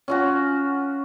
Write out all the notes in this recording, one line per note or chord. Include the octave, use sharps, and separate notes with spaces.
C#4 F4 F#4